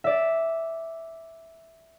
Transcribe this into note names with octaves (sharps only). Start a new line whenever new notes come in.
D5 E5